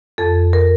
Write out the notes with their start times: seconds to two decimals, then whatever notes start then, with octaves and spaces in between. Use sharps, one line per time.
0.18 F2 A4
0.53 A#4